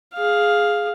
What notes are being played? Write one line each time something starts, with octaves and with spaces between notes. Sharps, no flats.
G#4 F5